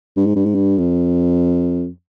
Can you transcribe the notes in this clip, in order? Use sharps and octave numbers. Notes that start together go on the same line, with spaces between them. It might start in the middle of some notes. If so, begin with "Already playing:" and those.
G2
G#2
G2
G#2
G2
F2